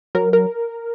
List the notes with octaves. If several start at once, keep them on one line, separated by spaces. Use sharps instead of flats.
F#3 A#4
A#4